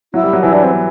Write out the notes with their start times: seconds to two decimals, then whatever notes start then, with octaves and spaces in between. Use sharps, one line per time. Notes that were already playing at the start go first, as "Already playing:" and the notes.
0.13 F#3 E4
0.24 G3
0.33 F#3
0.43 E3 E4
0.52 D4
0.63 C4
0.72 B3